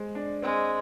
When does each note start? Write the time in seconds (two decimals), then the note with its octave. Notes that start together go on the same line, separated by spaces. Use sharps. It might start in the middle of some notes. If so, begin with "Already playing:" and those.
Already playing: G#3 C5
0.15 D4
0.42 G#3 C4